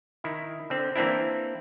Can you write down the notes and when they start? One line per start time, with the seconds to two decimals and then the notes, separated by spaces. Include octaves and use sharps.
0.24 D#3 E4
0.70 D3 C4
0.96 E3 A#3 C4 D4 E4